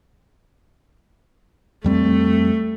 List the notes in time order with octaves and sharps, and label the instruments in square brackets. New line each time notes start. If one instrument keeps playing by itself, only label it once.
[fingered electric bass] F2 G3 C4 [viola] A3